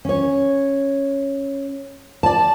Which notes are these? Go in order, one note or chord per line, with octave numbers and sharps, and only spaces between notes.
C#4 C#5
D5 A5